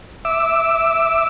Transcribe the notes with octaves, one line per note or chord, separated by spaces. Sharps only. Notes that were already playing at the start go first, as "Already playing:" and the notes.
E5 D6 E6